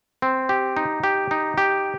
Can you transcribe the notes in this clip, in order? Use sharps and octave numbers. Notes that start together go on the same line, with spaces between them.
C4
G4
D#4
G4
D#4
G4